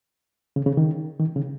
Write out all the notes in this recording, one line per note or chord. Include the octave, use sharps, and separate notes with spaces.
C#3
C#3
D#3
D#3
C#3